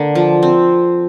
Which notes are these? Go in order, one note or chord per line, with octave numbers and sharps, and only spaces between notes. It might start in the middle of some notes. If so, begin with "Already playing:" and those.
Already playing: D3 A#3
F3
C4